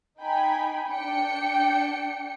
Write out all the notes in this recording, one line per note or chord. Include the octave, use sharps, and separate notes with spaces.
D#4 G5 G#5 B5
D4 G5 C#7